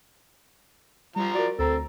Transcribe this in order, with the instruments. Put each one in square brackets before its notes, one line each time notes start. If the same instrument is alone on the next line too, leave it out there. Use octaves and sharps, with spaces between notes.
[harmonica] F3 A#5 [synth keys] G3
[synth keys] F#4 A#4 [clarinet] D5
[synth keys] D2 A#5 [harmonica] C4 [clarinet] A4